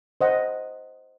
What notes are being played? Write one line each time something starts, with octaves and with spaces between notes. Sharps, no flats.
C5 D#5 F#5